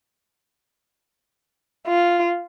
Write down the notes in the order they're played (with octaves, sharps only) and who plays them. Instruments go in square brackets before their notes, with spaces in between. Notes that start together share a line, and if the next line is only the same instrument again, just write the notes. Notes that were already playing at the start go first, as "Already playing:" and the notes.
[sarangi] F4